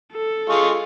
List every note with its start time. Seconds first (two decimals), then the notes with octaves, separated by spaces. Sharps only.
0.13 A4
0.49 G#3 F4 C#6